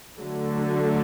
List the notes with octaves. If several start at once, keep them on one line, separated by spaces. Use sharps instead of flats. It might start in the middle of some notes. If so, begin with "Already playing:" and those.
D3 F#3 A3